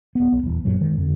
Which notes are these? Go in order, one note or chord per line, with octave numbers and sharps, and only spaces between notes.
D#1 B3
B1
D#1 E2
G1 F#2 A#2 F#3
D#3 G#3
F2 D3